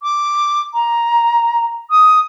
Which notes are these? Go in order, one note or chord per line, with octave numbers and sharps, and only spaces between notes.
D6
A#5
D#6